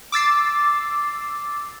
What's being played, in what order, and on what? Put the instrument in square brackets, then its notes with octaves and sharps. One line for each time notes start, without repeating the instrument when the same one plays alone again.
[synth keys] D6 E6 A6 C7